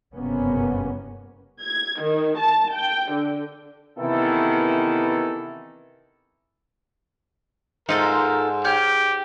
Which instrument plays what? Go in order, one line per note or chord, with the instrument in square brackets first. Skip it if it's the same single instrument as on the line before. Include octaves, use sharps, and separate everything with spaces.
[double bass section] F#1 G2 C3 A#3 B3 C#4
[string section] G#6
D#3
A5
G5
D3
[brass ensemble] C3 D#3 E3 B3 E4 A4
[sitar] G#2 [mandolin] D#4 F4 A4 [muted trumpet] A#4
[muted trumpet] G4 [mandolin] C#5 F6 G6